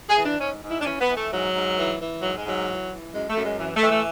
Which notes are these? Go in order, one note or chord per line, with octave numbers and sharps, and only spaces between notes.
G#4
E3
D4
G#2 C#4
G#2
E4
D4
E3 C#4
B3
E3
A3
G#2 F#3
G#2
E3
E3
G#2 F#3
G#3
G#2 F#3
E3
E3
F#2 G#3
A3
F#2
G#3
E3
A3
E3
A3